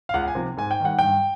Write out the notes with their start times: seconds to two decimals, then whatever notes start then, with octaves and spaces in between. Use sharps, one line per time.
0.09 F5
0.14 C#2 F#5
0.28 G#5
0.35 C3 F3
0.57 G#2 G#5
0.71 G5
0.80 D#3 G3 F#5
0.99 G2 G5